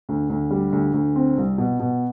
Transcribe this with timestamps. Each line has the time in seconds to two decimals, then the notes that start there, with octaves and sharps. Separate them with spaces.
0.09 D2
0.29 D2
0.51 G3
0.72 D2
0.94 D2
1.16 C4
1.37 C2
1.58 B2
1.79 B2